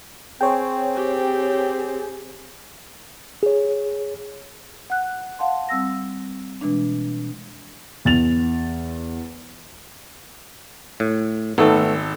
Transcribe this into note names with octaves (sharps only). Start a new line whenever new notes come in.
C4 G#4 C5 C#5 G5
G4
G#4 C#5
F#5 F#6
F5 F#5 A5 C6
G3 C4 E6 A#6
B2 E3 G#3 D4
E2 A6 F7
A2
G#1 A3 B3 A4